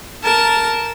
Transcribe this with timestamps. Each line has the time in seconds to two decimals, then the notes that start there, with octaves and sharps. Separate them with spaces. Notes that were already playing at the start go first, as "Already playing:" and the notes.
0.23 A#4 A5